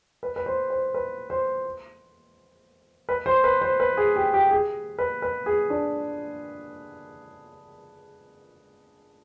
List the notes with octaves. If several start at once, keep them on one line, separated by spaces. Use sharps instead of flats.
B4
B4
C5
C5
B4
C5
B4
C5
B4
C5
B4
G#4
G4
G4
G#4
B4
B4
G#4
D4